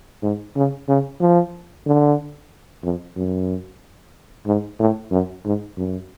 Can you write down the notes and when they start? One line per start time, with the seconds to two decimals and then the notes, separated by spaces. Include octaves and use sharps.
0.22 G#2
0.56 C#3
0.89 C#3
1.21 F3
1.87 D3
2.84 F2
3.17 F#2
4.46 G#2
4.80 A2
5.11 F#2
5.45 G#2
5.77 F#2